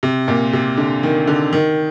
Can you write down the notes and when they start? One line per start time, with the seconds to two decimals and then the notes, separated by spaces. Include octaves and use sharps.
0.03 C3
0.28 A#2
0.53 C3
0.78 D3
1.03 D#3
1.27 D3
1.53 D#3